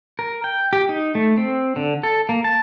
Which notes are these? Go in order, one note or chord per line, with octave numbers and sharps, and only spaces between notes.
A#4
G5
G4
D#4
A3
C4
D3
A4
A#3
A5